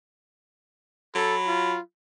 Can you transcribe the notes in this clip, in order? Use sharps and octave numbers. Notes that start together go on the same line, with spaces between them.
F#3 A4 B5
F4